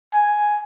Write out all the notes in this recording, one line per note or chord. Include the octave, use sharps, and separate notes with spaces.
G#5